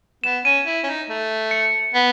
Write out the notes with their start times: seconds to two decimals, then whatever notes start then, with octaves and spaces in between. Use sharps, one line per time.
0.24 B3 E7
0.45 C#4 D#7
0.66 E4
0.84 C#4
0.87 D#4
1.09 A3
1.51 C#7
1.94 B3